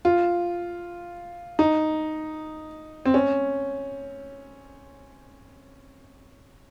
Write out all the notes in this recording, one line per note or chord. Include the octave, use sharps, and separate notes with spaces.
F4
D#4
C4
C#4